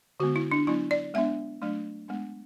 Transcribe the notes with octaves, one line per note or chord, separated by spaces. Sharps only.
D3 G#3 B3 F#4
E4
D4
F#3 B3 D4 E4
D5
G#3 B3 D4 E5
F#3 A3 D4
G#3 B3 D4